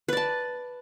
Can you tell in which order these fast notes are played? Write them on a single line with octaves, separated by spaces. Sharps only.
B4 D5 A5